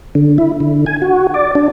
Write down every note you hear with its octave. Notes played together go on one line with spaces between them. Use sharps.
D3
E4
D3
G#5
F#4
D5
D4